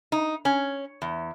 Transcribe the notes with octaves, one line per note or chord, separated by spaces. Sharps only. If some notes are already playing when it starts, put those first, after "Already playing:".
D#4
C#4
E2